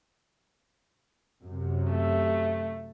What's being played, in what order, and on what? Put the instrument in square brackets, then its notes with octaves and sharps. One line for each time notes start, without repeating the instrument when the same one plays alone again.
[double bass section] F#2 C3
[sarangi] A3